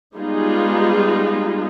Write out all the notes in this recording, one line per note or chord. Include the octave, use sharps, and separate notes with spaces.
G3 G#3 B3 D#4 F4 G#4